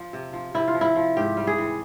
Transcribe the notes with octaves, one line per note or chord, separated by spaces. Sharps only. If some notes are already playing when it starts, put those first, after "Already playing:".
Already playing: F3
C3
F3
C3 E4
F4
F3
E4
F3
G#2 G4
G3
G#4
E3